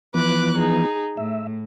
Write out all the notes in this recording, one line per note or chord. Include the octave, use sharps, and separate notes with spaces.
E3 F3 B3 B4 D6 F#6
D#4 G#4
A2 E5